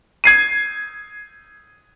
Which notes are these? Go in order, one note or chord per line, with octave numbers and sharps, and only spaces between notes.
G#6 C7 D#7